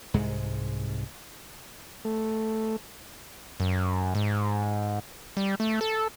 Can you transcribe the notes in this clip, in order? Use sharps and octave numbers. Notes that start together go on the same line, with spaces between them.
C2 G#2 G#3
A3
F#2
G#2
G3
A3
A4